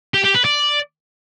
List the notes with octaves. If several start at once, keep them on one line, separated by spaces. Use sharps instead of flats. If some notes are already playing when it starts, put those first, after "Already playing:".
G4
G4
B4
D5